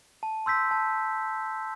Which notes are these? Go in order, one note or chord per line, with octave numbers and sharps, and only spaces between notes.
A5
C6 E6 G6 B6
A5